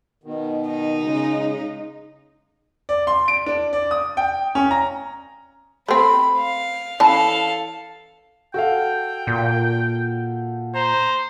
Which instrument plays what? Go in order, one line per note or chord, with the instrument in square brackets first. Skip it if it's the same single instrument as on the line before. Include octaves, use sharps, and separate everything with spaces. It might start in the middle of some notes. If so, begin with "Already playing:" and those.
[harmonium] B2 D#3
[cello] D#4
[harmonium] C#3 G#3
[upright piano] D5
C6
D7
D4
D5
D#6
G5
C#4
A#5
[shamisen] A3 C4 [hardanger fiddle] B5
[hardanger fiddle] F5
[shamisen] E3 C#4 A5 [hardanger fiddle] A4 F5
[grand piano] F#4 A4 F5 [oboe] G5
[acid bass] A#2
[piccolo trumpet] C5 [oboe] A#5